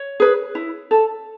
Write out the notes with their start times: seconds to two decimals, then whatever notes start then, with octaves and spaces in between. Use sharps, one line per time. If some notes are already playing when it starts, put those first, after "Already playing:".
Already playing: C#5
0.20 G#4 B4
0.55 E4
0.91 A4